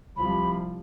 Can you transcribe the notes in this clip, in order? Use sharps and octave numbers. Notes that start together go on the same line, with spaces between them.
C2 C3 F3 B5